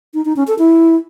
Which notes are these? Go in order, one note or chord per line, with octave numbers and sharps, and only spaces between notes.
D#4
D#4
C#4
A4
E4